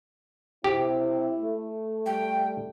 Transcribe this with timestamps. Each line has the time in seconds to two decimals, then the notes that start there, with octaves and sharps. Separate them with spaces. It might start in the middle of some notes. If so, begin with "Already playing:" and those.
0.64 C3 C4 E4 G4
1.39 A3
2.06 G3 G5